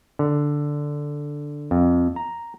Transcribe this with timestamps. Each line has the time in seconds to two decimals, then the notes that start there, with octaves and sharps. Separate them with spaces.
0.19 D3
1.71 F2
2.16 A#5